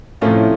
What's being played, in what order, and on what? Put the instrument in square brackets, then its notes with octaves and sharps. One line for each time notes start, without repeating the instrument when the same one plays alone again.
[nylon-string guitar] A2 [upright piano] C3 F3 A3 C#4 F4